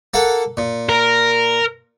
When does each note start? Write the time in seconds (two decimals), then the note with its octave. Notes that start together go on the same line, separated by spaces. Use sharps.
0.14 A#3 A4 F#5
0.57 A#2
0.89 A#4